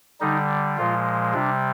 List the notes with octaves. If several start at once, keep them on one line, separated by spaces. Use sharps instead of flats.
D3 G3 D#4
A#2 F3 G#3 F4
C3 G3 D4